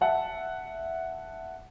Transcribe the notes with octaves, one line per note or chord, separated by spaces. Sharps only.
E5 F#5 A5